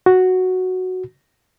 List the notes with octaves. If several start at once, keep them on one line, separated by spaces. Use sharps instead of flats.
F#4